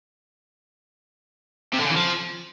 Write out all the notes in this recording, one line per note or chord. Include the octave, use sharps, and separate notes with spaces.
C3
D3
C#3
E3
F3